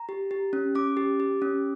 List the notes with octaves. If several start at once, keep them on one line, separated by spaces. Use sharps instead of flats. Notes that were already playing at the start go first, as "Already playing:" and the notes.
Already playing: A#5
G4
G4
C#4
C#4 D6
G4
G4
C#4